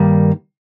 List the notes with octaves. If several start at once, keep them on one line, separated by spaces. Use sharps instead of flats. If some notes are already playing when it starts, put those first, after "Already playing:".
Already playing: G2 D#3 G3 A#3